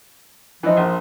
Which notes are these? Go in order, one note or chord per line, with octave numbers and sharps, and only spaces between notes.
E3 F3 D#4
A#1